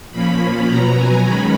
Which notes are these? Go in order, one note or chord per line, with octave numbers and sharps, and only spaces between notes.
A#2 F3 A#3 C#4 B5
B5
B2 F#3 B3 A#5
G#5
D#3 G#3 C#4 B5